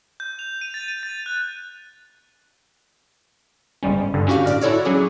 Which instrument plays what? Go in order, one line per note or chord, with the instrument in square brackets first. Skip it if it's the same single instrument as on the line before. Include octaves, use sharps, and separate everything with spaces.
[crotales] G6
F7
D#7
A6
D#7
A6
F#6
[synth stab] G1 G#2 G3 C#4
G2 D3
C#4 D4 F#4 G4 F5
A2 D5 F6 A#6
E4 F#4 A4 C#5 D5
F#3 C#4 G#4 D6